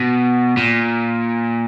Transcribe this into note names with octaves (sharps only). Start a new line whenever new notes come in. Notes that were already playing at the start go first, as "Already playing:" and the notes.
Already playing: B2
A#2